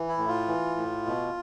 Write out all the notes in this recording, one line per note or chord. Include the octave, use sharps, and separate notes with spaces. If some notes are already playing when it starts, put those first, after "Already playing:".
Already playing: E3
E4
A2
F4
E3
A2
B2